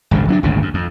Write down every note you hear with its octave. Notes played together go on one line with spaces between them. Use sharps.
G#1 C#2 F#2 D3
F#3 C#4 D4
G#1 D2 A#2 C#3
F#2
F2